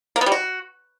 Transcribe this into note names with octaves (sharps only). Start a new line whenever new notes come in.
A#3
B3
G3
F#4